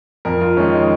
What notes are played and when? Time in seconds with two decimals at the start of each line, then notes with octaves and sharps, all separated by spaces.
0.25 F2 A#4
0.41 F4
0.57 D#3 G#3 C#4
0.73 D#4